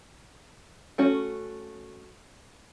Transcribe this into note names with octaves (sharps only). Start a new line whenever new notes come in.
A3 C#4 F#4